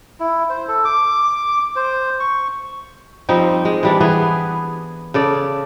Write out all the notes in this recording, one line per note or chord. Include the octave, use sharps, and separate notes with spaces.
E4
C5
A4
D6
C5
C#6
F3 G3 C4 D#4
G#3
E3 G3 D4
E3 B3 G#4
C#3 A4 D5